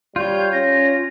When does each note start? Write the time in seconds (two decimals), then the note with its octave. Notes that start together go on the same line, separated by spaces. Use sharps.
0.16 G3 F4 C#5 G6
0.53 C#4 A#6